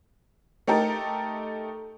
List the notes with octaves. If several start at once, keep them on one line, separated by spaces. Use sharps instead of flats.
A3 D#4 G4 A4 A#4